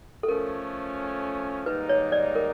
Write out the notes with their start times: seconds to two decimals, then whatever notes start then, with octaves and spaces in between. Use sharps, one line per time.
0.23 A4
0.28 F3 A3 C#4 A#4
1.66 G#2 D#3 G3 A#3 D#4 B4
1.89 C#5
2.12 D5
2.35 A#4